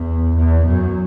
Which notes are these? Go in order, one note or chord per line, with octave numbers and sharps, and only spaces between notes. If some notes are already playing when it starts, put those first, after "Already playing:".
Already playing: E2
E2
F#2